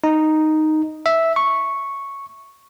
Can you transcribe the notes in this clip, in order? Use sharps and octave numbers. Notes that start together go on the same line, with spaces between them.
D#4
E5
C#6